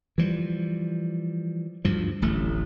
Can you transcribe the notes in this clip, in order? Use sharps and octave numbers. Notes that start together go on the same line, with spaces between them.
E3 F3 G3
D2 G2 F3
D1 A1 A3